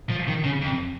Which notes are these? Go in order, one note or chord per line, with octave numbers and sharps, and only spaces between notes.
F3
D#3
C#3
F2